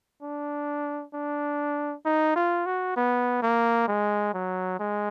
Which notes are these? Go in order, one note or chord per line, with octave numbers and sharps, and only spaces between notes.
D4
D4
D#4
F4
F#4
B3
A#3
G#3
F#3
G#3